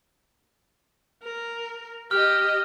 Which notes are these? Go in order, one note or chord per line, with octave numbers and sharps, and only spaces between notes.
A#4
G4 D#5 F6